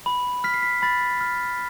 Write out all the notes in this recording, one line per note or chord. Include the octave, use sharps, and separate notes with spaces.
B5
F6 B6
C7
B6
B5 A6
F6